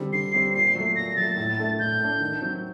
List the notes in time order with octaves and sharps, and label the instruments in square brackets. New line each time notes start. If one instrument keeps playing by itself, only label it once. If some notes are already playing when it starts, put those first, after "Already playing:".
Already playing: [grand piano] D3 G3 C4
[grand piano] D3 [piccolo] C7
[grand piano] G3 C4
[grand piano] A#2 [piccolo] C7
[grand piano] F#3 A3
[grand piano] A#2 [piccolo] A#6
[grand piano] F#3 A3 [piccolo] A6
[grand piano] A2
A3 D4
[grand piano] A2 [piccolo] G6
[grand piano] A3 D4
D#3
F#3 C4